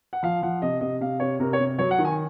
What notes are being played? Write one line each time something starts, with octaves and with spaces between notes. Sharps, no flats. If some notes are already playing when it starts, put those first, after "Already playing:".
F#5
F3 F5
F3 F#5
C3 D#5
C3 D#5
C3 F5
C3 C#5
C3 A#4
C#5
C3
F#3 C#5
F#5
D#3
G#5